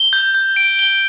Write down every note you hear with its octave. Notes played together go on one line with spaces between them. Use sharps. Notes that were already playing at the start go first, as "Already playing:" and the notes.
Already playing: G7
G6
G6
D7
G7